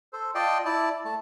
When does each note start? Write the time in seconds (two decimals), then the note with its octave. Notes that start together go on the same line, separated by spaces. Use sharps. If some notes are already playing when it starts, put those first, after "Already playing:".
0.13 A4 C5
0.35 F4 D5 D#5 G5 A5 C6
0.65 E4 D5 A5
1.05 A3 A5